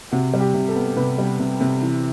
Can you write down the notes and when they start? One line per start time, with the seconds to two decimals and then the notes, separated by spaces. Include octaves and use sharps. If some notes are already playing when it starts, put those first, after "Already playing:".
0.11 C3 F#4
0.34 G3
0.40 G4
0.54 C3
0.68 A4
0.75 B3
0.96 C3 B4
1.18 G3
1.40 C3
1.60 C3
1.82 E3